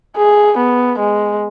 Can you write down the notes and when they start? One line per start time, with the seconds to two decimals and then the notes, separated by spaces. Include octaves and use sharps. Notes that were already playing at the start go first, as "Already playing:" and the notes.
0.17 G#4
0.58 B3
0.99 G#3